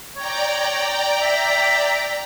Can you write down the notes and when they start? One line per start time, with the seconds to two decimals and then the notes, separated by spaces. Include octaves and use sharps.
0.16 C#5 D5 G5 A#5
1.22 E5